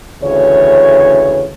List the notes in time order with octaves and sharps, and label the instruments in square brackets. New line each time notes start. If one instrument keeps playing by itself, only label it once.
[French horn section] D2 C#3 E3 C#5